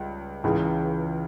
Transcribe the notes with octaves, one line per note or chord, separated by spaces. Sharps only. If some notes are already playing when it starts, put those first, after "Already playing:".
Already playing: C#2 G3
C#2 C#3 E3